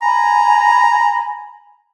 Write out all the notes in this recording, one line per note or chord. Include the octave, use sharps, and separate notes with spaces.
G#5 A#5 B5